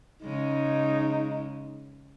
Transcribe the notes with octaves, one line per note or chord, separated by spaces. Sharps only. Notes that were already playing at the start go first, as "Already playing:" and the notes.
C#3 G#3 D#4